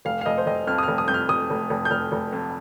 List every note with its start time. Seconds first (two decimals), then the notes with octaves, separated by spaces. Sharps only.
0.05 F1 F5
0.21 F5
0.26 F1 D#5
0.38 C5
0.46 F1 D#5
0.67 F2 F6
0.78 D#6
0.83 F6
0.88 F1
0.98 D#6
1.08 F2 G6
1.14 F6
1.29 F1 D#6
1.50 F1
1.70 F1
1.85 G6
1.91 F1 F6
2.12 F1
2.33 F2